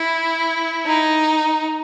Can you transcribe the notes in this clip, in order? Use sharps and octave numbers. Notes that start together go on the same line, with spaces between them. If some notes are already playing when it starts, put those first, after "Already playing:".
Already playing: E4
D#4